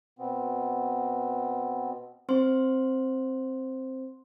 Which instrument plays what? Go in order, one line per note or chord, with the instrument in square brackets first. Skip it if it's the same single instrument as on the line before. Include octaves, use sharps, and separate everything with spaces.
[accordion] B2 B3 C4
[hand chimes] C4 C5 C6